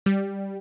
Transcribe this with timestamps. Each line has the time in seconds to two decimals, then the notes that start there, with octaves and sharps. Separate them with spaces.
0.06 G3